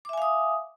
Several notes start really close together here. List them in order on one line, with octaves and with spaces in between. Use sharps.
D6 E5 G#5 F5 D#6